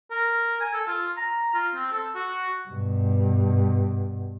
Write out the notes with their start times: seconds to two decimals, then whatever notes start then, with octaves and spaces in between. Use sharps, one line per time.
0.11 A#4
0.60 G#5
0.73 A4
0.88 F4
1.17 A#5
1.54 F4
1.75 C4
1.92 A4
2.15 F#4
2.69 G2 B2